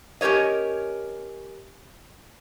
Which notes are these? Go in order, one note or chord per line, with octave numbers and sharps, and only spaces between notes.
C#4 G4 A#4 C#5 D#5